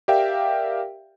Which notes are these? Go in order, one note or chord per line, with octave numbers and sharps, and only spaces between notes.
G4 A#4 D5 E5 F5 G5